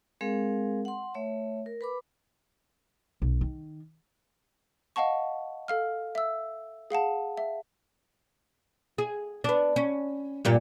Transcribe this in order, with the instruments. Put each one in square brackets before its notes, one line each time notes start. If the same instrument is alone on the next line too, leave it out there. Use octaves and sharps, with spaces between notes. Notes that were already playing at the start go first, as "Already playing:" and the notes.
[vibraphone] G#3 C4 G#4 A#4 F5
F#5 C6
A3 C#5 E5
A#4
B4 B5 D6
[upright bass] B1
D#3
[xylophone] D#5 F5 F#5 A5 C#6
A4 F5 F6
E5 E6
G#4 F5 F#5 A5
E5
[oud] G#4
B3 D4
C#4
G2 A#2 G4